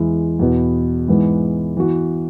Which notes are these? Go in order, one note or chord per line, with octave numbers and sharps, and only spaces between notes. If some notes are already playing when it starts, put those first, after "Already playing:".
Already playing: E2 E3 G#3 E4
E2 B2 B3
G#2 E3 G#3 B3
E3 B3 F#4